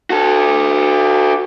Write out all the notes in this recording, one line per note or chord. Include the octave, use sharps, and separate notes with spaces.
F#4 A4